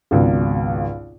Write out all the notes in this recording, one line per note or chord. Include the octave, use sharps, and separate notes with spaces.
G#1 C#2 B2